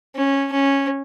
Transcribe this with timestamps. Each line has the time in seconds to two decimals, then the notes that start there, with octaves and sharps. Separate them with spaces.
0.16 C#4
0.52 C#4